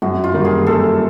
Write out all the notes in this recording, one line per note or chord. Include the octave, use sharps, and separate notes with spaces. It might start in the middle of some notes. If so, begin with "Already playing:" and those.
F#2 F#4
F4
D#3 G3 A#3 D#4
G#4
F#2 A4